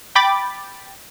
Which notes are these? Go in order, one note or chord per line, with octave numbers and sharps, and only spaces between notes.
G5 B5 D6 A6